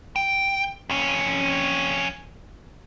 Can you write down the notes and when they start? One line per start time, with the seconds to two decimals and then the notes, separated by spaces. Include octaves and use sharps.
0.16 G5
0.90 F2 C#4